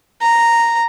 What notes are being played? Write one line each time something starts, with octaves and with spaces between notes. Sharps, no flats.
A#5